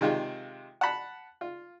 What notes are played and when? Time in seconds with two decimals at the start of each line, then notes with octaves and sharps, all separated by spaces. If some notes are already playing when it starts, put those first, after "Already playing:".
0.01 C3 D#3 G#3 F4
0.81 F#5 A5 B5
1.41 F4